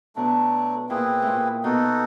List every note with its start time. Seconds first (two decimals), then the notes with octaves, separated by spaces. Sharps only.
0.16 B2 F#3 A3 D4
0.89 A#2 C4 E4 G#4 B4
1.22 A2
1.27 A#2
1.63 B2 D#4 F#4 A4